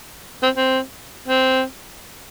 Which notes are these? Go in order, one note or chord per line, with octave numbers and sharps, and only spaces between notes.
C4
C4
C4